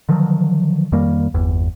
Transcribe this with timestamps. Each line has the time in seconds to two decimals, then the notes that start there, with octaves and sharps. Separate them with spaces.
0.09 D3 D#3 F3 F#3
0.92 F2 D#3 G3 A#3
1.34 G1 E2